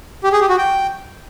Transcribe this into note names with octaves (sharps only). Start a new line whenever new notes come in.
G4
G#4
G4
F#4
G5